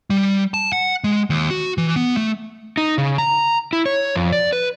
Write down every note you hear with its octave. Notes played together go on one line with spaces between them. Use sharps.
G3
A5
F#5
G#3
D#2
F#4
E3
B3
A3
D#4
C#3
A#5
E4
C#5
F2
D5
B4